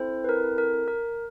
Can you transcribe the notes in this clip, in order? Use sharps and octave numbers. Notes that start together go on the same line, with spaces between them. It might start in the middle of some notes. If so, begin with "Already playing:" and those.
Already playing: C4 E4 A4 C5
B4
A#4
A#4
A#4